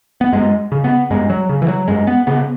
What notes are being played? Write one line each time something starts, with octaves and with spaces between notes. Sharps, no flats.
B3
F#2 G#3
C#3
B3
F#2 G#3
F#3
C#3
E3
F#3
F#2 G#3
B3
C#3 B3